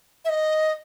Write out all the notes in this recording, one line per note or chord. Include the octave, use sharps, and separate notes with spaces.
E5
D#5